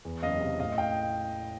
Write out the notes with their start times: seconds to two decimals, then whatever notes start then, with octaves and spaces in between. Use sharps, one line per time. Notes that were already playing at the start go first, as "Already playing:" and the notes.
0.05 E2
0.22 F#1 D#5 F5
0.41 C3
0.60 A2 D#5 F5
0.78 F5 G5